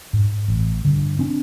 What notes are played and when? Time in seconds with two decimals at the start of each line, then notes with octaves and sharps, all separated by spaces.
0.13 G#2
0.48 A1
0.85 G2 D3
1.19 C4 D4